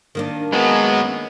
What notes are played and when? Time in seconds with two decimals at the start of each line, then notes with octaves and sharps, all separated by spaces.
0.15 D#3 A#3 D4
0.53 F#2 F#3 G#3 B3